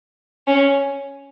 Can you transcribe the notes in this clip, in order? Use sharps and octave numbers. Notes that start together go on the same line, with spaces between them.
C#4